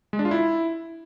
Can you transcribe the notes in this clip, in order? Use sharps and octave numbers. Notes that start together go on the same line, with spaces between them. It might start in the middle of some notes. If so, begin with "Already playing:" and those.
G#3
D4
F4
E4